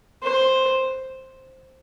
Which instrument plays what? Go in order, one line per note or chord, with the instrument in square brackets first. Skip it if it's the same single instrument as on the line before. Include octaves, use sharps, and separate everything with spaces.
[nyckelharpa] C5